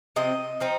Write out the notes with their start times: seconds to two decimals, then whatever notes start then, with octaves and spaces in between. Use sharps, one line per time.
0.16 C3 F3 C4 D#5
0.60 F3 C4 D#4